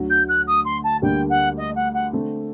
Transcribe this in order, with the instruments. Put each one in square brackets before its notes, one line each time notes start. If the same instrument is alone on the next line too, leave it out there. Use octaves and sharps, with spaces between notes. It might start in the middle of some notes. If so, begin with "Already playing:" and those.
Already playing: [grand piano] D2 D3 F#3
[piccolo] G6
F#6
D#6
C6
A5
[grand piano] D2 D3 G3 A#3 D4 [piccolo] G5
[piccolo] F#5
D#5
F#5
F#5
[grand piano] D3 A3 C4